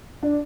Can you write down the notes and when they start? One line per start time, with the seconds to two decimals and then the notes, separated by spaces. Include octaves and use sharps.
0.23 D4